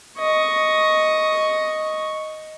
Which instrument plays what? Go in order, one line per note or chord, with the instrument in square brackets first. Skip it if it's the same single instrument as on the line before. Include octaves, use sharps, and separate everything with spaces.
[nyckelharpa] D#5 C#6